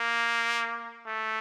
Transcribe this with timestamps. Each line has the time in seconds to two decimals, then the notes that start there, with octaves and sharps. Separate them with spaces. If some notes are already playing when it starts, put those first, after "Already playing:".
Already playing: A#3
1.07 A3